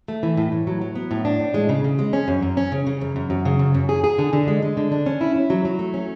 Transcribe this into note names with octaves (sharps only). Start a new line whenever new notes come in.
A3
E3
A2
A2
F#3
F#3
B3
A2
D4
A2
G#3
C#3
C#3
G#3
C#4
F#2
F#2
C#4
C#3
C#3
F#2
F#2
F#2
C#3
F#2
F#2
G#4
G#4
D3
D3
G#3
G#3
D3
D4
C#4
E4
E4
F#3
F#3
A3
C#4